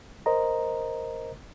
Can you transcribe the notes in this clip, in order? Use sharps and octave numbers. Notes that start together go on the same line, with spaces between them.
A#4 C5 D#5 A#5